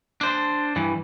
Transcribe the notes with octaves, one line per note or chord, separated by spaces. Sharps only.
D4 C5
G2 E3